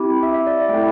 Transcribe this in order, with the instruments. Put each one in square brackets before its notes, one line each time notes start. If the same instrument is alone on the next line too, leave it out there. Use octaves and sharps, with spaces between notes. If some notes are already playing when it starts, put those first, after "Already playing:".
Already playing: [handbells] C4 E4 G4
E5
E5
D5
E5
A3 E4 A4 G5